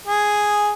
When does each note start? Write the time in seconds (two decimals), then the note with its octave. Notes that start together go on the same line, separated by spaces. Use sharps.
0.07 G#4